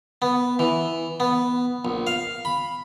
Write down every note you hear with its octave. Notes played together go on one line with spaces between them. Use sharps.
B3
E3
B3
A#1
F5
B5